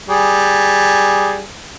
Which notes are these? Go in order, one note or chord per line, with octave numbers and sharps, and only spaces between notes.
G3 G#4